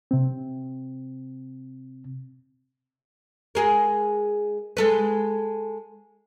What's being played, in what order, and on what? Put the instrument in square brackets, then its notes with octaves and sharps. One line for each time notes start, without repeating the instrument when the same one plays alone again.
[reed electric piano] C3 C4
[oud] G#3 G#4 A#4
G#3 A4 B4